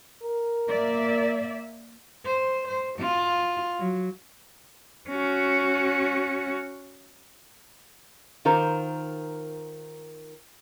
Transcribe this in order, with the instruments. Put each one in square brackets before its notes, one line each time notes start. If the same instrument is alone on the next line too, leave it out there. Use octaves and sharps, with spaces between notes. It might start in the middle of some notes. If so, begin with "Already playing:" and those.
[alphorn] A#4
[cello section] A#3 D5 E5
[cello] C5
C5
F4
F#3
C#4 F#4
[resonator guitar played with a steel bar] D#3 F4 A#4 C5